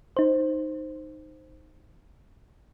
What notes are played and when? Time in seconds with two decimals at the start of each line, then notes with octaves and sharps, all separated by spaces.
0.17 D#4 C5